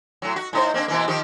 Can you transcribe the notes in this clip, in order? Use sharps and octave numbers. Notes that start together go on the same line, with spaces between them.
A2 F#3
F#4
A2 D#4 C5
A#3 C4 D4
B2 E3 A#3
D#3 F3 G4